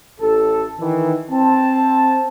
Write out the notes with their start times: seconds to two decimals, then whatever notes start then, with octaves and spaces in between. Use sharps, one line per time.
0.20 A1 A4
0.80 D#3 E3
1.30 C4 A5